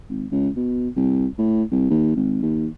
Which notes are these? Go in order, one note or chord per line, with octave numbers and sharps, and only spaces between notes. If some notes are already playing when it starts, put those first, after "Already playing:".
G#1
C#2
B2
C2
A2
C2
D#2
G#1
D#2